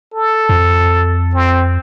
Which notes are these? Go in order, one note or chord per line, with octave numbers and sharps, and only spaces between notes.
A4
F2
C4